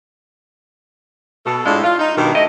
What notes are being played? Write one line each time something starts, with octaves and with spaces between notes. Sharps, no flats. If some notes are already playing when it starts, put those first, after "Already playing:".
B2 A4
A2 G#3 D4 F4
F4
D#4
G2 B2 D#3
A3 E4 D#5